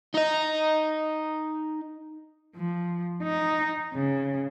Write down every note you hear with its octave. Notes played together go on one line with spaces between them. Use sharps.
D#4 D#5
F3
D#4
C#3